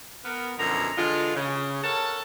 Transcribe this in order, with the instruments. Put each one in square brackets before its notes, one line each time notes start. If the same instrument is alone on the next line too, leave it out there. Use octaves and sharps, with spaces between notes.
[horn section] B3 A#4
F#2 B2 D3 F3 E4 A#5
D3 E3 G#3 F4
C#3
A4 A#4 C#5 F#5 A5